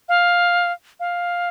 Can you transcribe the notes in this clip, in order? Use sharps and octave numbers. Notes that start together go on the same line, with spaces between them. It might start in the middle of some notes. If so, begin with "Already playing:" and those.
F5
F5